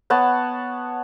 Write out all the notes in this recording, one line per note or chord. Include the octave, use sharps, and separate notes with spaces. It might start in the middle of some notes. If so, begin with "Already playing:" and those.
B3 C#5 F#5 A5